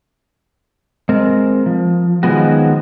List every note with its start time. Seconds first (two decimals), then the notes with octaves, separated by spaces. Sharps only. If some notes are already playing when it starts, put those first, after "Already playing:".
1.09 G#3 C4 A#4
1.66 F3
2.23 D#3 F3 F#3 G#3 B3 F#4